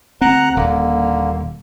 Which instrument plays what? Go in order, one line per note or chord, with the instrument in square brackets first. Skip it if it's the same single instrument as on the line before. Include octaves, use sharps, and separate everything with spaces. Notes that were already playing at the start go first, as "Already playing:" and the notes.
[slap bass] D2 C4 [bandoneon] F#5 A#5 F#6
[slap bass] D#1 [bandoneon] D3 A#3